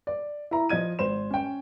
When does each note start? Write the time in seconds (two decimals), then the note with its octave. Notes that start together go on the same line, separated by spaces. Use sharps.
0.07 D5
0.51 E4 A#5
0.69 F3 D#5 G#6 D#7
0.99 G#1 C5 E7
1.31 C#4 G5